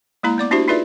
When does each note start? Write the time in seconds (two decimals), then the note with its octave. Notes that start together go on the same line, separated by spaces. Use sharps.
0.23 G#3 A#3 E4 A#5
0.38 B3 D5 D6
0.51 D4 E4 F#4 G4 C5 E5
0.68 D#4 F4 G#4 B4 D5 E5